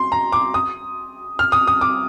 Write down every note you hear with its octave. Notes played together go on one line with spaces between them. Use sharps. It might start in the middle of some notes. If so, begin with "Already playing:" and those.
Already playing: C6
A#5
D6
D#6
F6
D#6
D#6
D6